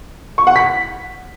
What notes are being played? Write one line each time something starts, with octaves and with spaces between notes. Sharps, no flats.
C#6
F#5
B6